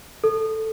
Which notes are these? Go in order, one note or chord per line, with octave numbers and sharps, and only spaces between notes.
A4